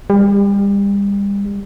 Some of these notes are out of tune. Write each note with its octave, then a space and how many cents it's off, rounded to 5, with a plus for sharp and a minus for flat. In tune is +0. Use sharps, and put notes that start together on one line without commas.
G3 +35